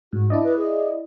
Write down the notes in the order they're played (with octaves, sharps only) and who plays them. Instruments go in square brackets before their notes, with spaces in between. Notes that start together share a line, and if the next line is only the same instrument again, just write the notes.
[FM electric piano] G#2 [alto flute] F#4
[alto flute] D4 [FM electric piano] E4 D5 D#5
[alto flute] B4
G#4